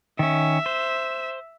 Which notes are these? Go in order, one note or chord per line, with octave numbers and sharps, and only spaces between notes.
D#3 C#4 E5
C5